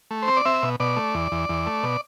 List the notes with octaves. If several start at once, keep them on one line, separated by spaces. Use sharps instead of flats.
A3
C5
C4
D5
C4 E5
B2
B2 D5
A3
E2
E2
E2
A3
B2